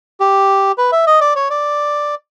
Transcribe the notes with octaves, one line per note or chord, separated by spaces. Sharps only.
G4
B4
E5
D#5
D5
C#5
D5